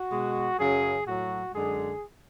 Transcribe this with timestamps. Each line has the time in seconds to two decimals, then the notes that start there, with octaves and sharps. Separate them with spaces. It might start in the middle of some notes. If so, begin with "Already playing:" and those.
Already playing: F#4
0.10 B2 G#3
0.58 F#2 C#3 F#3 G#4
1.06 A2 F#3 F#4
1.53 F#2 D3 G#3 G#4